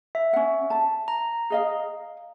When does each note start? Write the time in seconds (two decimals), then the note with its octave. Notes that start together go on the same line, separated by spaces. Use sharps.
0.15 E5
0.33 C#4 F#5
0.70 A5
1.08 A#5
1.50 G#4 D#5 F5